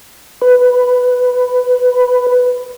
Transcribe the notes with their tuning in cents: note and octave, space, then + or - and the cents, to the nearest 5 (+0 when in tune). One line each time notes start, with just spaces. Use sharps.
B4 +10